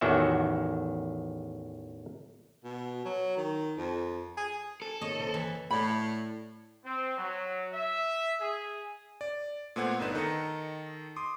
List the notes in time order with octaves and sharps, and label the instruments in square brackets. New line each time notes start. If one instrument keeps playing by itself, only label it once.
[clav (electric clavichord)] A1 E2 D#3 F#4 E5
[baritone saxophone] B2
F#3
D#3
F2
G#4
[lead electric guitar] A4
[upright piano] G#2 A#3 [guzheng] C#5 D#5
[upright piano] F#1 C5 A#6
[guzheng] E3
[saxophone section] A2 [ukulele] D5 B5
[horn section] C4
F#3
E5
G#4
[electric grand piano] D5
A#2 A3 B3 C5 F#5 G#6
G1 B3 D4 D#4 B4 E7
D#3 A4 D#5 A#5 C#7
C6 D6 D#6